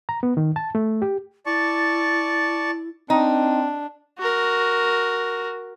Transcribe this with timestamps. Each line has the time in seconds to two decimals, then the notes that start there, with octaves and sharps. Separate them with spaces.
0.09 A#5
0.23 B3
0.37 D#3
0.56 A5
0.75 A3
1.02 G4
1.46 E4 D5 A5 C#6
3.10 C4 D4 D#4
4.19 F#4 A#4